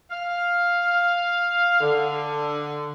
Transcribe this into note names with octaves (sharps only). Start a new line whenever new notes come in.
F5
D3